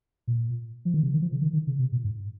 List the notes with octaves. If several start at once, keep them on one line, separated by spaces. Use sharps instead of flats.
A#2
F3
D#3
C#3
D#3
F3
C#3
D#3
D#3
C#3
C3
A#2
G#2